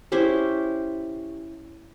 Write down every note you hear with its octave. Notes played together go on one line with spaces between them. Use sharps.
C#4 E4 G4 C5